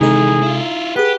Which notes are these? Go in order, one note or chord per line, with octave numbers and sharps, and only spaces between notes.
C3 D#3 E3 G#3 D#4 G#4 A4
E4 F4
G4 G#4 B4 F#5